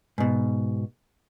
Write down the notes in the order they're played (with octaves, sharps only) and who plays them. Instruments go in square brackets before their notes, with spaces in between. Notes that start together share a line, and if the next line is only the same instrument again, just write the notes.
[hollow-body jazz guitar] G#2 B2